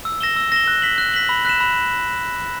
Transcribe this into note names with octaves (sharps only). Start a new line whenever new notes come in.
E6
A#6 E7 G7
E6
A#6 E7 G7
F#6
B6 F#7
F#6
B6 F#7
B5
F#6 B6 E7
B5